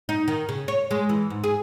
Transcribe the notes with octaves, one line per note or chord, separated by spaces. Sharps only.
D#4
D#3
C#3
C#5
G#3
E3
G#2
G#4